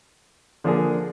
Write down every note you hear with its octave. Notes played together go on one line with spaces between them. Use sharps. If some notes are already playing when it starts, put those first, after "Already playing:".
D3 F3 A#3 D4 G#4